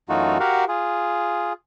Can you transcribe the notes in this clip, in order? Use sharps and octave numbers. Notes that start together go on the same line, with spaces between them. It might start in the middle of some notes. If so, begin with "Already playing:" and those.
F#2 E3 A3 D#4 F4 F#4
F#4 G4 A#4 F5 F#5
F4 G#4